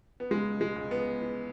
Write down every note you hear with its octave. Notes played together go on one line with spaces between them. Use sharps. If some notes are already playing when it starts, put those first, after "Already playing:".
B3
C#2 G#3
G#3
C#2
B3
E3